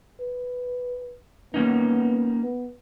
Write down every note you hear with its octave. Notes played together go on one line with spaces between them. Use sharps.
B4
A#3 B3 C#4 D#4
B3